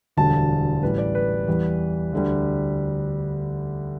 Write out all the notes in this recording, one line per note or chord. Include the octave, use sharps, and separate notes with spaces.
E1 D2 D3 G3 A5
A1 A2 G3 B4
D5
B4
E2 E3 G3
D2 D3 G3